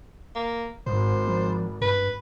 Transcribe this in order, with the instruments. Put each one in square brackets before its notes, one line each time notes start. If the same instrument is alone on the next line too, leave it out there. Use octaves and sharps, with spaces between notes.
[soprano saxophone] A#3
[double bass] G#1 [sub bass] G#2 [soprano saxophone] C5
[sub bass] F3
[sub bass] G2 [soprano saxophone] B4